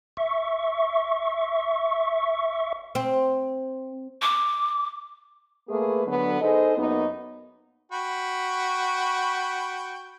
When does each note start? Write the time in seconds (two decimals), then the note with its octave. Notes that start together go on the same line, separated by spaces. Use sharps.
0.17 E5 C#6
2.95 C4
4.22 D6
5.69 A3 A#3 G#4 A4 B4
6.07 D3 F#3 B3
6.41 D#4 G#4 A4 C5 D#5
6.77 F#2 A#3 B3 D#4
7.92 F#4 G5 B5